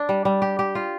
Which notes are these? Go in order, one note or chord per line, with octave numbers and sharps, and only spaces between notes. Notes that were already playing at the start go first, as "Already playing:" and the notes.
Already playing: D4
G3
G3
G4
G4
F4